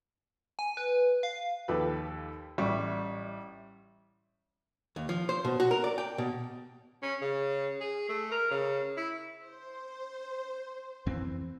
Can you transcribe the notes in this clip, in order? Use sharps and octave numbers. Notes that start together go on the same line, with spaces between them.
G#5
B4
F5
D#2 F3 G4 A4 B4
A1 G3 E5 C#6
D#2
F3
C5
B2
F#4
A#4
D5
G5
B2
C#4
C#3
G#4
A3
A#4
C#3
E4
C5
F2 E3 C4